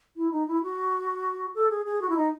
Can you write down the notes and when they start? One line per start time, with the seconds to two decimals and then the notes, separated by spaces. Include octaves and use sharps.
0.17 E4
0.32 D#4
0.48 E4
0.63 F#4
1.55 A4
1.70 G#4
1.86 G#4
2.02 F#4
2.10 E4
2.17 D#4